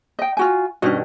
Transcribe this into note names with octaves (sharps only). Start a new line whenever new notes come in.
D#5 G5
F4 F#4 G#5
G2 B2 D#3 C#4 D#5